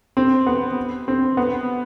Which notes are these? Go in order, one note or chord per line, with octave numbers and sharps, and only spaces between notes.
C4
B3
C4
B3